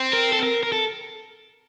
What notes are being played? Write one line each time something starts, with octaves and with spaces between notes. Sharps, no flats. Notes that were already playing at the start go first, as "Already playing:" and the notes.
Already playing: C4
A#4
A4
A#4
A#4
A4